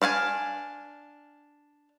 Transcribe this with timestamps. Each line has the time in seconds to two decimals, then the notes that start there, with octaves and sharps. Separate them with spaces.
0.02 D4 F5 F#5 G#5